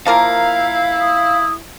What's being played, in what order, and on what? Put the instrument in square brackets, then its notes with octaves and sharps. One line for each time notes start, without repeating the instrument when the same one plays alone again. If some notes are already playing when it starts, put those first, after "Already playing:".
[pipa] F3 A#3 A#4 [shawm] E4 [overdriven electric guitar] F5
[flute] D#6